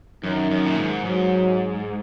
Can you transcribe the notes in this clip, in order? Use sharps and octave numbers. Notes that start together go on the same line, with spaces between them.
F#2 D#3
F#2
A#2
G#2
G#2 F#3